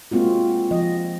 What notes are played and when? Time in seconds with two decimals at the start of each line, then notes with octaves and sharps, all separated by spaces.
0.11 G#3 A#3 C4 F4 F#4
0.71 F3 D#5